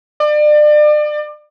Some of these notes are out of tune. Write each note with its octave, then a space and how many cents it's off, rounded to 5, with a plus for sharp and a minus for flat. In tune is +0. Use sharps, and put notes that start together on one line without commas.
D5 +35